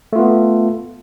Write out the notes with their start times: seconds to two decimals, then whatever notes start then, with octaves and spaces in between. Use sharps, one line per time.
0.13 A3
0.16 F4
0.19 B3